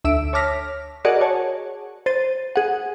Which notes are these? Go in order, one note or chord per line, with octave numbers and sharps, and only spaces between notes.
D2 E5 E6 D7
C#5 A5 D6 F6 A#6 B6
F#4 G#4 A#4 D5 D#5 F#5
C#5 A5
C5 A6 D#7
G#4 F#5